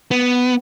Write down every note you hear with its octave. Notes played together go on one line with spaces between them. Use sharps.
B3